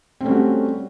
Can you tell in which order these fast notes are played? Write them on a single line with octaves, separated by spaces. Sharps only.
C4 A3 C#4 G3 F#4